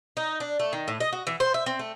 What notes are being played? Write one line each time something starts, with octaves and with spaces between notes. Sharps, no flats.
D#4
D4
A3
D#3
A2
D#5
F#4
E3
C5
E5
C4
A3